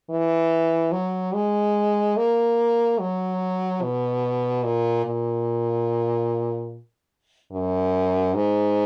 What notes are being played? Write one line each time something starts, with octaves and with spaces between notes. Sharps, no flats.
E3
F#3
G#3
A#3
F#3
B2
A#2
A#2
F#2
G#2